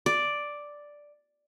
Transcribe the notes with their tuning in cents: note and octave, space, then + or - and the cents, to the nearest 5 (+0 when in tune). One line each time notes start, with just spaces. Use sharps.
D5 +0